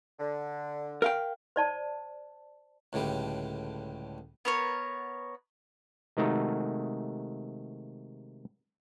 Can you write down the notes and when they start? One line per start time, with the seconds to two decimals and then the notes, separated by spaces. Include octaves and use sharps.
0.19 D3
1.02 A#4 F5 G5
1.56 C5 D5 A5
2.93 C#2 A2 D3 G3
4.45 B3 A#4 C#5
6.17 C3 D#3 G#3 A3 D#4 F#4